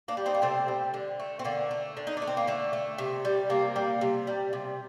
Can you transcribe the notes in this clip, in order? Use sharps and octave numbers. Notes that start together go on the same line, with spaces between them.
A#3 D4
G3
C4 D#4
A#3
C3 A3 C4
G3
D3
A3
C4
D3 A#3
A3
D3
D#4
D4
A3
C4
A#3
D3 A3
A3
C3
G3
C3 A#3
G3
C3
G3
C3